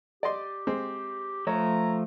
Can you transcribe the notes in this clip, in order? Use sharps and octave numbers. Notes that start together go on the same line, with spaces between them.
G4 D5 D#5 C6
G#3 C4
F3 A3 C#5 A#5